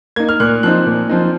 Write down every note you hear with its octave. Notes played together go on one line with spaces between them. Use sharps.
A#3 D#4 G#6
F6
A#2 F#6
F3 C4 D#4 F#6
A#2
F3 C4 D#4